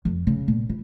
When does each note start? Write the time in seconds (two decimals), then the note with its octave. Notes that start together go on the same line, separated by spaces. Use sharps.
0.05 F2
0.27 C#3
0.48 A#2
0.69 E4